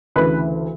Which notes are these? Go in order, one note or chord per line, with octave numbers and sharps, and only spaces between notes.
D2 C#3 E3 B4